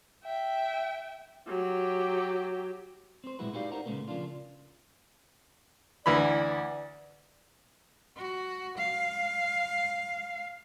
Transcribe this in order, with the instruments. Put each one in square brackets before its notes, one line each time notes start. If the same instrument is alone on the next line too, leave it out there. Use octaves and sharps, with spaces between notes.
[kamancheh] E5 G5
[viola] F#3 G4
[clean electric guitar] C4 C5
A#2 G3 G#3 E4 F#4 B4
D#4 F#4 G4 B4 D5 F5
D#4 A#4 C5 F#5 A#5
A#2 C#3 F#3 G#3 A3 B3
C#3 F3 A#3 D4 F4
[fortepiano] D2 E3 B5 [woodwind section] D5
[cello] F#4
F5